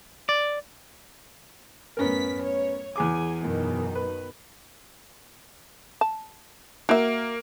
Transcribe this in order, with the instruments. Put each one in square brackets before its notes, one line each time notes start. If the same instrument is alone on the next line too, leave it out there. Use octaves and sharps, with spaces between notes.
[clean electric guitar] D5
[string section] F#2 A2 B6 [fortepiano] B3 C#4 A#4
[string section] C#5
[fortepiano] E2 G#4 D6 [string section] G#5
[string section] F#2 B2 D#3
[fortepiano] B4
[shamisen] A5
[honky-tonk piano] A#3 [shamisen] F#4 E5